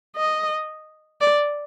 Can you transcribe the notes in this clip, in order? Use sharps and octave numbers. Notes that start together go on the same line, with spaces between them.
D#5
D5